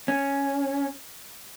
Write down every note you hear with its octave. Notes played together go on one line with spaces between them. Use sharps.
C#4